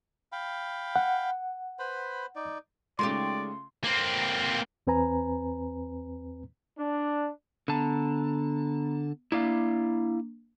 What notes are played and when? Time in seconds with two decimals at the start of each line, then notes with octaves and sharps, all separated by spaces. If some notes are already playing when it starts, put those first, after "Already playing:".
0.32 F5 G5 B5
0.96 F#5
1.79 B4 C5 B5
2.36 D#4 D5
2.99 C#3 G#3 A3 D#4 F4 G4 D5 C6
3.84 A#3 C4
4.87 E2 C4 B4 G#5 A#5
6.79 D4
7.68 D3 B3 A5 A#5
9.32 A#3 D4 E4 D5 F5